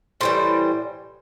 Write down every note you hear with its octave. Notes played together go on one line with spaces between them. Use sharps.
A2 E3 G3 C5